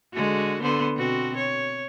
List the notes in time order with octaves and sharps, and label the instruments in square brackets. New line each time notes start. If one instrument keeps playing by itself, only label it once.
[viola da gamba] D3 G#3 F#4
D3 B3 C5
B2 C4 F#4
C#5